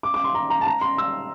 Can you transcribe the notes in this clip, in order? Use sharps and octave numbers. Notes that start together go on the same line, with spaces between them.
D6
D6
C6
A#5
A#5
A5
A#5
C6
E6